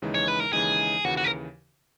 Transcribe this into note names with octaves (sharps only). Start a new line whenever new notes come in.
D#2 C#3 E3 G#3 D#4
C#5
B4
A#4
D#2 C#3 E3 G#3 D#4 G#4
D#2 C#3 E3 F#4
F#4
A#4